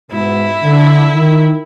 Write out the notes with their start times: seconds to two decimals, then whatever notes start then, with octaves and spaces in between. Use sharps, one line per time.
0.12 G#2 B2 E4
0.63 D3
1.13 D#3